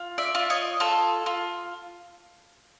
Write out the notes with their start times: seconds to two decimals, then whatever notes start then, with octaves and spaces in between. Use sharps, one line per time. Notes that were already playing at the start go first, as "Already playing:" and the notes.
Already playing: F4
0.18 D5 E5
0.35 F4
0.50 C#5 D#5
0.80 F4 A4
1.26 F4